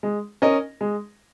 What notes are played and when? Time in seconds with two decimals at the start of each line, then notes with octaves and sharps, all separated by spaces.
0.03 G#3
0.42 C#4 A#4 D#5
0.81 G#3